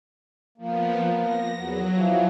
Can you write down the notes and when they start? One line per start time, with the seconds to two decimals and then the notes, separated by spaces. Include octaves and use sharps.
0.58 F3 A#3 B3
1.20 A#6
1.55 E2 F#3 B3
1.93 E3 F3